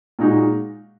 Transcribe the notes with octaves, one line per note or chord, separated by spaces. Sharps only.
A#2 G#3 D#4 F#4